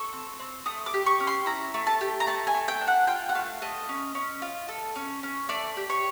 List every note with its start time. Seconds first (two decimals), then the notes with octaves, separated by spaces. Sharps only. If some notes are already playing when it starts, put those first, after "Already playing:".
Already playing: A4 C#6
0.13 C4
0.40 C4
0.66 A3 D#6
0.86 D6
0.94 G4
1.06 C#6
1.20 C#4
1.27 C6
1.46 E4 A#5
1.74 A3
1.87 A5
2.01 G4
2.20 A#5
2.27 A3 A5
2.47 G#5
2.54 A3
2.68 G5
2.81 D4
2.87 F#5
3.07 F4 G5
3.29 F#5
3.35 A3 F5
3.62 A3 D#5
3.89 C#4
4.15 C#4
4.42 F4
4.69 A4
4.96 C#4
5.23 C#4
5.49 A3 D5
5.77 G4
5.90 C#5